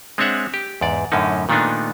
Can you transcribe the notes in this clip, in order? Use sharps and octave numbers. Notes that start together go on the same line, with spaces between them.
G#3 C4 D4 C#5 E5 F#5
G4
E2 G#2 D5
F#2 A2 D3 C#4 D#4
A#2 D#3 A3 B3 D4 D#4